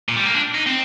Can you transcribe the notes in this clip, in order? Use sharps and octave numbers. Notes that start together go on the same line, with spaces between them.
A#2
G3
A#3
D4
D#4
C4